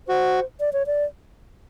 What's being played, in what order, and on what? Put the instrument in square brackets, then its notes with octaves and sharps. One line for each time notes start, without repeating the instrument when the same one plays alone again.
[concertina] F#4 [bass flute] C5
[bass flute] D5
C#5
D5